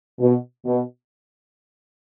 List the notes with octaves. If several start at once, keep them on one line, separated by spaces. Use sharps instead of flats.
B2
B2